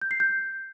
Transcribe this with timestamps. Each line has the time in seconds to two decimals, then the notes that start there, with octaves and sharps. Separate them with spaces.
0.02 G6
0.11 C7
0.20 G6